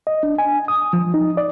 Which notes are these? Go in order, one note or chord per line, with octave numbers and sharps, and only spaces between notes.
D#5
D4
G#5
D#6
F3
D#4
D5